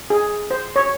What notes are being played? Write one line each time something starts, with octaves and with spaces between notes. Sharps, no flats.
G#4
C5
C#5